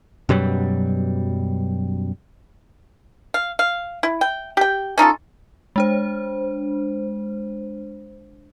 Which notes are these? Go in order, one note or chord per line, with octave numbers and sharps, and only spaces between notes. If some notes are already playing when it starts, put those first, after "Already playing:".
F#2 B2 F#3 G3
F5
F5
E4
G5
G4 G5
C#4 D#4 F4 A4
G#3 D4 C5